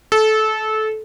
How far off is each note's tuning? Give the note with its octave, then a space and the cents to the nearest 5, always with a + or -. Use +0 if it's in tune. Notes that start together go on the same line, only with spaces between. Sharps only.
A4 -20